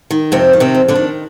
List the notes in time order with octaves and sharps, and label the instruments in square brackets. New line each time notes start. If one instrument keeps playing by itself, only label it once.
[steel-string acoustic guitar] D#3
F2 C3 C4
D#3
C3 C4
F2
D3 D4
D#3